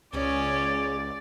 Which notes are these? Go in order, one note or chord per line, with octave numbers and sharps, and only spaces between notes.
C#2 C#3 C#4 G#4 C#5 D5